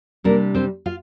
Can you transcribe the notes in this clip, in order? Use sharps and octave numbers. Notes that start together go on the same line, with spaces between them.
C3 G3 A#3 D4 A#4
C4 C5
F4 F5